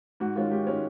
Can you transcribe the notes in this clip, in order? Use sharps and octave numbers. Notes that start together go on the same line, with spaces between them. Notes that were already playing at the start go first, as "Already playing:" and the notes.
G#2 F#4
D#3 G#3 C#4 F4
G#2 G4
D#3 G#3 C#4